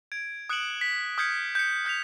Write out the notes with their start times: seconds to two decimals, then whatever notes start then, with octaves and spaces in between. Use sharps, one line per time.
0.12 G#6 D7
0.49 D#6 F#6 C#7 D7 E7 F#7
0.81 B6
1.18 D#6 F6 G6 G#6 B6 C#7
1.55 G6 C#7
1.85 F6 G6 B6 F7